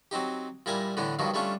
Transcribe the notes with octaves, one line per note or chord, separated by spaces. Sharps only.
F#3 C4 D#4 G4
A#2 G3 E4 A#4 G#5
A2 D3 E3 B3 D4
G2 B2 D#3 F3 F#3
G3 A3 C#4 D4 F4